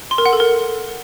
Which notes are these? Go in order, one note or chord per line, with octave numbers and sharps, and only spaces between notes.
C6
A#4
F#5
A4
A#4